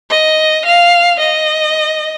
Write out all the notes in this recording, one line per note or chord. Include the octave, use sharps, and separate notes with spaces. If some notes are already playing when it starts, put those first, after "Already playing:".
D#5
F5
D#5